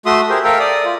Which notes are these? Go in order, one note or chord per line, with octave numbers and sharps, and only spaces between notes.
A3 F#4 E5 C6 D#6
G4 G#4 A#4 C5 E5
A4 A#4 E5 F5 G5
D5 D#6
F4